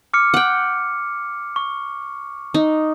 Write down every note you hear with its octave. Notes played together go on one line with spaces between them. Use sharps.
D6 F6 C#7
F#5 G5
C#6
D#4